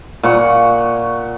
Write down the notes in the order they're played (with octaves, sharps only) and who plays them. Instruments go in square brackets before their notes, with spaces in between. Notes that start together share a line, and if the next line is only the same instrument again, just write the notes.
[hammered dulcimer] A#2 F#5 C#6